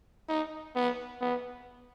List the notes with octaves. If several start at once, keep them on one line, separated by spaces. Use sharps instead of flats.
D#4
B3
B3